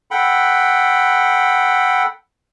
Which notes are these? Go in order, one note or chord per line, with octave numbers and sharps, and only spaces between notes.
A4 F#5 G5 B5